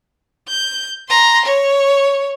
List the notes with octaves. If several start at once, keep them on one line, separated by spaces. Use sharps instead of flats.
G6
A#5 C6
C#5